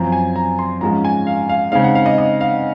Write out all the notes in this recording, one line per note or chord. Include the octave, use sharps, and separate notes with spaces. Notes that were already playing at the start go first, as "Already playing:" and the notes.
Already playing: F#2 F3 C4 A#5
G#5
A#5
C6
G#2 F3 G#3 C#4 A#5
G#5
F5
F5
C#3 G#3 C4 D#4 F5
F#5
F5
D#5
D#5
F5